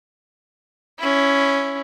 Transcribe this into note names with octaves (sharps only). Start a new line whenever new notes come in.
C#4 E4